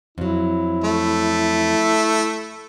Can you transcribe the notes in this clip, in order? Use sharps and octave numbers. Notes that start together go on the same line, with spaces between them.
F2 F#3 E4
A3